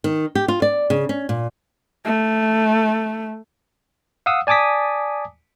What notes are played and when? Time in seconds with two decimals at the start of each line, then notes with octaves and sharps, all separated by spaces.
0.04 D#3
0.35 G4
0.48 F4
0.62 D5
0.90 C#3
1.09 C#4
1.29 A#2
2.06 A3
4.26 F5 F#5 D#6 E6
4.47 D5 G#5 A5 D6 D#6 B6